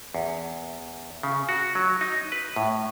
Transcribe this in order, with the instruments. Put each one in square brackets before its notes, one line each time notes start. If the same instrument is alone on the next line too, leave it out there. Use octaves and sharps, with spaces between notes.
[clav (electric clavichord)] E2
C#3
F#4
F#3
D#4
B4
A2